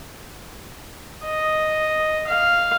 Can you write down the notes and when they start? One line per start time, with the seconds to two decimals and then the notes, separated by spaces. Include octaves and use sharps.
1.25 D#5
2.27 F5